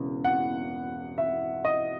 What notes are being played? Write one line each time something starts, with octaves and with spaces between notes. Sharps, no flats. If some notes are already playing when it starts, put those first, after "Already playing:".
Already playing: E1 E2 C#3
F#5
E5
D#5